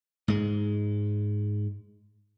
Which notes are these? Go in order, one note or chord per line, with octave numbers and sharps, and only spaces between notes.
G#2 G#3